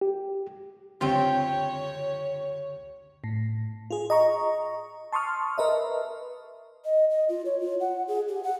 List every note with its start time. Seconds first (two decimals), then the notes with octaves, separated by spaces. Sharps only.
0.01 G4
1.01 C#2 F#2 D3 C4 F4 G4 C#5 G5
3.24 A2
3.91 F4 G#4
4.10 D#5 A#5 C#6
5.12 A5 C6 C#6 D#6 F6
5.58 A#4 B4 D#5 E5
6.85 D#5
7.10 D#5
7.29 F4
7.46 C#5
7.60 F4
7.80 F#5
8.08 G#4
8.29 G4
8.44 F#5